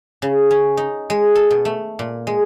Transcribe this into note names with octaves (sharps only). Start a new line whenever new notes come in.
C#3
C#4
D#4
G#3
A4
B2
A3
A#2
G#3